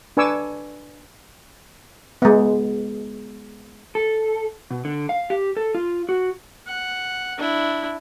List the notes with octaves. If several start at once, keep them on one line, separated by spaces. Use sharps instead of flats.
D4 B4 G#5 C#6 D6 E6
G#3 B3
A4
B2
D3
F5
G4
A4
F4
F#4
F#5
D4 E4